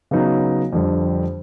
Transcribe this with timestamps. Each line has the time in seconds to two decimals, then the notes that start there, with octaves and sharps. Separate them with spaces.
0.11 C#3 F#3 B3 D#4
0.73 F2 D3 G3